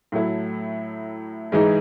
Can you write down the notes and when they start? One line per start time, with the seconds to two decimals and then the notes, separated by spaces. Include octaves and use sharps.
0.12 A2 F#3 A3 E4
1.52 G#2 E3 G#3 D#4